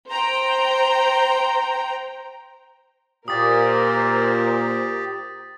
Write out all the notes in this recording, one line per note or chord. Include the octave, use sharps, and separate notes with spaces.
C5 G5 A#5
A#2 G4 A#4 C5 D#6 A6